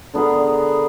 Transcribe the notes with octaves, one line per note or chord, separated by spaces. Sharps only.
D3 B3 G#4 A#4